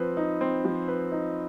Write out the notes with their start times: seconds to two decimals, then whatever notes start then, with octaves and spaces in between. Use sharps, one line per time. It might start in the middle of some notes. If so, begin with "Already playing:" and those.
Already playing: F3 C4 B4
0.17 D#4
0.41 C4
0.65 F3
0.88 B4
1.12 D#4